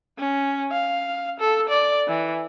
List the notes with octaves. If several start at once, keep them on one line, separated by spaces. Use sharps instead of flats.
C#4
F5
A4
D5
E3